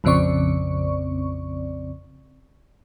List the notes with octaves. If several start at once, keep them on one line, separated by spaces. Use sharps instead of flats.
A#1 F2 C#3 C4 D5 C#6